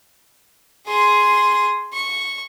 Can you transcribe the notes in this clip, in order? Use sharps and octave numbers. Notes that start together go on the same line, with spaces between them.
G#4 C6
C#6